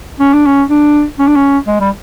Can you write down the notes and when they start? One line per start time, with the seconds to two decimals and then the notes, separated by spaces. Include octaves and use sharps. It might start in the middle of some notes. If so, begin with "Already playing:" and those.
0.20 C#4
0.33 D4
0.46 C#4
0.70 D4
1.19 C#4
1.27 D4
1.35 C#4
1.67 G#3
1.80 G3